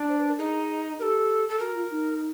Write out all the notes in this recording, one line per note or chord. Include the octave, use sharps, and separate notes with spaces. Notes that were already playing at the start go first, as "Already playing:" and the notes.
Already playing: D4
C5
B4
A#4
D#4 G#4
G4 A4 A#4
A4
F#4 A#4
F4
D#4